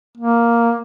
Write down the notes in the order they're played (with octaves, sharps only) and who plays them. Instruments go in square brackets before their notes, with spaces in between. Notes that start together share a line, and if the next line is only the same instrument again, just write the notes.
[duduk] A#3